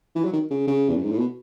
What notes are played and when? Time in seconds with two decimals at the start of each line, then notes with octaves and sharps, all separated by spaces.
0.15 E3
0.24 F#3
0.33 D#3
0.50 C#3
0.67 C#3
0.89 E2
0.96 F#2
1.04 G#2
1.11 A2
1.18 B2